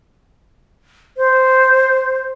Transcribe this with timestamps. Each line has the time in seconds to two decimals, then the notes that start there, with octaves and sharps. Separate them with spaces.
1.17 C5